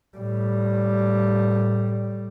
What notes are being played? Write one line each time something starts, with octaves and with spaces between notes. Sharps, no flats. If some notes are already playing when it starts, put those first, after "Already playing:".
A2 G3